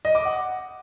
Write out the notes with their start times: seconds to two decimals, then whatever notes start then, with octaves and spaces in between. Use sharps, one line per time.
0.05 D#5
0.15 D6
0.25 F#5